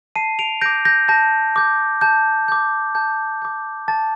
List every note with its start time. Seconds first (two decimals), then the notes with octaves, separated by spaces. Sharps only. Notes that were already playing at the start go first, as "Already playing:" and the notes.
0.16 A5 C7 D#7
0.39 D7 F7
0.61 G6 A#6 D7
0.66 D6
0.85 G6 A#6
1.08 A5 G6 A#6
1.56 D6 G6
2.01 A5 G6
2.48 D6 G6
2.95 A5 G6
3.42 D6 G6
3.88 A5 A6